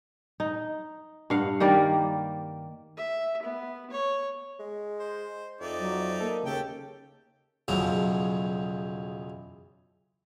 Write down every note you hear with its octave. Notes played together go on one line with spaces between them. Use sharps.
D#4
G2 F5 F#5
D#3 G3 A#3 D5
E5
B3
C#5
G#3
C5
F2 D#4 D5 E5
F#3
A#3 A4
D#2 C#3 G4 A4 G5
B1 E2 C#3 F3 F#3 A#5